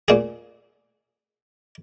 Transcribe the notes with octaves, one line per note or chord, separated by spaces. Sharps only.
A#2 G#4